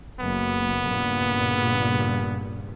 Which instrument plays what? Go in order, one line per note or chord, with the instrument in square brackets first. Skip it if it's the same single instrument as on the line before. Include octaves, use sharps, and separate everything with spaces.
[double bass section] F#1 [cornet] B3
[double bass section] G2 A#2 C#3